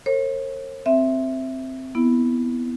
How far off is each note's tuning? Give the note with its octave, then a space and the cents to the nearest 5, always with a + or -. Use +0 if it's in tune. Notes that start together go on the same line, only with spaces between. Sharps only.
A#4 -30 C#5 -45
C4 +0 E5 +0
B3 +0 E4 +0